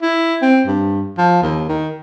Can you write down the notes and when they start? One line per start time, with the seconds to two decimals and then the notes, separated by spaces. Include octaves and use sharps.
0.02 E4
0.42 C4
0.67 G2
1.18 F3
1.42 D#2
1.69 D#3